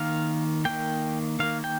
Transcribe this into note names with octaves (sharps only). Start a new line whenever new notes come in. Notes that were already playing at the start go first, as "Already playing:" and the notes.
Already playing: D#3 A#3 F5
D#3 A#3 G5
D#3 A#3 F5
G5